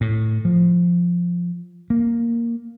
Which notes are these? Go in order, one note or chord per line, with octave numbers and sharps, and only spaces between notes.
A2
F3
A#3